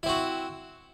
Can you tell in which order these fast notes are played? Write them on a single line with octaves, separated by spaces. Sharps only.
E4 C4 F#4